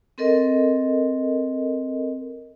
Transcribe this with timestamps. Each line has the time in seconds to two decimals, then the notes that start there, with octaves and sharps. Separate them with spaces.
0.18 C4 A4 A#4 D#5